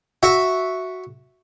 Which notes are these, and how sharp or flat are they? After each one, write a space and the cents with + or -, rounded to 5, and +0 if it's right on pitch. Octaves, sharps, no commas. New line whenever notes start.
F#4 +0 E5 +0